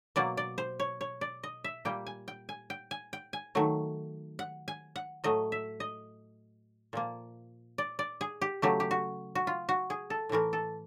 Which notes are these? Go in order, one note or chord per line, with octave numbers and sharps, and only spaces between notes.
B2 F#3 A#3 D5
D5
C5
C#5
C#5
D5
D#5
E5
A#2 G3 A#3 G5
G#5
G5
G#5
G5
G#5
G5
G#5
D#3 F#3 A3
F#5
G#5
F#5
A2 F#3 A3 D#5
E5
D#5
A#2 F3 A#3
D5
D5
G#4
G4
C#3 F#3 A3 G4
G4
F#4
F#4
F4
F#4
G#4
A4
A2 E3 A3 A#4
A4